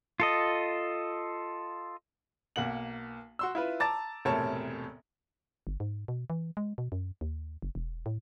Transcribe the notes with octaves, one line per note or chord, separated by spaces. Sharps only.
F4 A4 D#5
B1 A#3 F#5 F#7
F#4 C6 E6
E4 F4 B4
A5 A#5 D6 A6
E1 A2 C3 A#4 C#5 A5
G1
G#2
B2
E3
G#3
B2
F#2
D#2
F#1
E1
A2